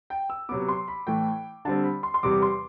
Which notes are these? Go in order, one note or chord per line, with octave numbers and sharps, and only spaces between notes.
G5
E6
C3 F#3 B3 D6
C6
B5
A2 E3 A3 G5
D3 G3 C4 A5
B5
C6
C6
E2 C3 G3 D6
C6